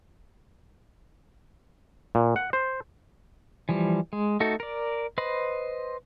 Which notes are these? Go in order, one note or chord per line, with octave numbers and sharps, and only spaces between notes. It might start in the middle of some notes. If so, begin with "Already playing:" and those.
A#2
F#5
C5
E3 F3 G3
G#3
A3 D#4 F#4 A4
A#4 D5
B4 C5 D#5 B5